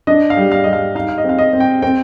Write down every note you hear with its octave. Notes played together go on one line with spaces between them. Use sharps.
D4 D#5
F5
G3
F5
G3 D#5
F5
D#4 F5
F5
D#5
C4 F5
D#5
C4
G5
C4 G5